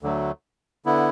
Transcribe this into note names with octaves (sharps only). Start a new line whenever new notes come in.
D2 D3 F#3 A3
D3 B3 E4